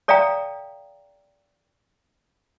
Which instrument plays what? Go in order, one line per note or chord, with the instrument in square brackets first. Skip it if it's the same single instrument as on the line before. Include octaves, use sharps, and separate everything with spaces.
[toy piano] A4 D5 E5 F5 G5 A#5